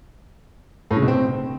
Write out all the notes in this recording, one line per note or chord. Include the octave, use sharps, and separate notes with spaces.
A2
C#3
B2
C4